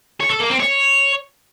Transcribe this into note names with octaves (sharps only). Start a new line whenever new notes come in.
C#5
A4
A#3
C4
C#5